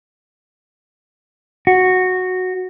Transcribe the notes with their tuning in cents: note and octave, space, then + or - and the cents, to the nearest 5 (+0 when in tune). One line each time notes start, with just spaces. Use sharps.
F#4 -5